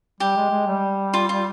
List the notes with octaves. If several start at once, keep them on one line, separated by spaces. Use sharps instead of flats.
G3 G4
G#3
G#3
G3
F4
F4